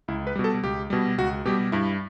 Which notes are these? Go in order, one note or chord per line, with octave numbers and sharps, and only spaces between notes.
C#2 E4
B4
B2 G3
A4
C#2 G4
B2 G3
C#2 F#4
B2 G3 G4
G2 E4